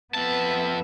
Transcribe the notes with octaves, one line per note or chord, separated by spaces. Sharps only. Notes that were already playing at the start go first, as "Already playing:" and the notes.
F2 B3 E5 A5